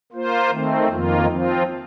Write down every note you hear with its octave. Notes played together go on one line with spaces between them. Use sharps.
A#3 F4 C5
D#3 A3 C4
F2 D#3 A#3 F4
F3 C4 F4